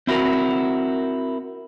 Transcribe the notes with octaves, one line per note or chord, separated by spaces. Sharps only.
C4 E4 F#4 A#4